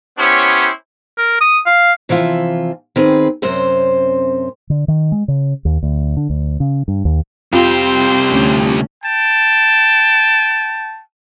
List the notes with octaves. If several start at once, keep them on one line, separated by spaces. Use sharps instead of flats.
B3 C#4 E4 G4 C5 C#5
A#4
D#6
F5
C3 E3 F3 F4 E5
D#3 C4 G#4 B4
F#2 C3 C4 C#4 C5
D3
D#3
G#3
C#3
D#2
D2
D3
D2
C#3
G2
D#2
C2 F2 C4 F4 G4 C5
D2 C#4 D4
G5 A5